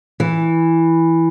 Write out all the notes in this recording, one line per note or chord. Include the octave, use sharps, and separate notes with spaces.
E3